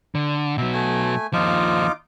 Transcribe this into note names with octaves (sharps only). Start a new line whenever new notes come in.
D3
B2 F#3 E5
A3 G#5
D#2 F3 D#4 F4 D6